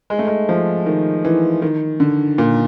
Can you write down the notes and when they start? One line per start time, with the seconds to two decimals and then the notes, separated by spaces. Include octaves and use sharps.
0.10 G#3
0.19 A3
0.27 G#3
0.49 F3
0.86 D#3
1.25 E3
1.62 D#3
2.00 D3
2.38 A#2